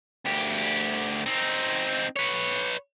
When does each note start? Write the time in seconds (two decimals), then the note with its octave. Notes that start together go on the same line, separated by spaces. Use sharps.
0.25 D2 G4
1.26 C4 D#4
2.16 B4 C#5